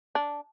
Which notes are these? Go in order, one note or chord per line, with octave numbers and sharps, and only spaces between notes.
D4